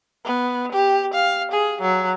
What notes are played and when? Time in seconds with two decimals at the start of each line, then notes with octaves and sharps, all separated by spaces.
0.25 B3
0.72 G4
1.14 F5
1.52 G#4
1.81 F#3